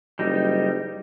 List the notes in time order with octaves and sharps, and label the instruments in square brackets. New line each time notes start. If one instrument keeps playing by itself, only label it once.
[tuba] F#1 [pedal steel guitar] G3 D#4